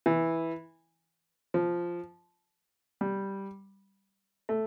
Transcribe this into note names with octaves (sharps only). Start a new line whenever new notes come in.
E3
F3
G3
A3